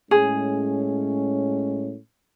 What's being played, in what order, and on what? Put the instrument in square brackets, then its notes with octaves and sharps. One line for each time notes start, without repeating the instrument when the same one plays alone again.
[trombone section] A2 G#3 C#4 [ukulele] G#4